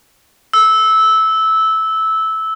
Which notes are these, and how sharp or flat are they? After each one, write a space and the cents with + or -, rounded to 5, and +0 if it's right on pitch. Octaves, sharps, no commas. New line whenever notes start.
E6 -15